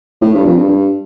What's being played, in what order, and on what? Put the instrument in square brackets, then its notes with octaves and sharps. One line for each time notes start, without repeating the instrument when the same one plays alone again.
[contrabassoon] A2
G2
F2
G2
G2